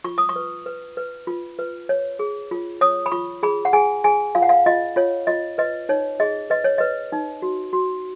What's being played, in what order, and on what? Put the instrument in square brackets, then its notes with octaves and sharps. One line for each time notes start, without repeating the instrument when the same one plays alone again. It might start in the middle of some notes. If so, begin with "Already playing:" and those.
[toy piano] F4 C#6
D#6
C#6
B4
B4
B4
F4
B4
C#5
G#4
F4
C#5 D#6
B5
F4 C#6
G#4 B5
F#5
G#4 G#5
G#4 G#5
F4 F5
F#5
F5
F4 D#5
F4 C#5
F4 D#5
B4 D#5
D#4 C#5
G#4 D#5
B4 D#5
C#5
B4 D#5
D#4
F#4
F#4